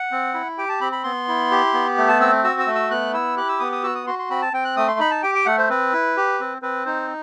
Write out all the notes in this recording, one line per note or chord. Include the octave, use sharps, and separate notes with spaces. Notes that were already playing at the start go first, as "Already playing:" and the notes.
Already playing: F#5
C4
E4
G4 G5
A5
C4 B5
B5
B3 C6
E4
G4
B3
A3
A5
C4 E6
F#4 E6
E6
A3
E6
B3 F#6
E4 E6
G4 F#6
E6
B3 D#6
D#6
F#4 E6
D#6
F#4 C6
C6
C4 B5
A5
C4 G5
F#6
A3 D#6
C6
D#4 B5
A5
G4 G5
G5
A3 F#5
C5
C4 B4
E4
G4
C4
C4 B4
D#4 C5